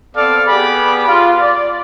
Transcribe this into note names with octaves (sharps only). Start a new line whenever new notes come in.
B3 C4 A4 D5 F5
B3 G4 G#4 D5 B5 D6
F4
D5